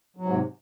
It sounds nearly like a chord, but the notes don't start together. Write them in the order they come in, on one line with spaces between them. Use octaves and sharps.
F#3 G#2 C3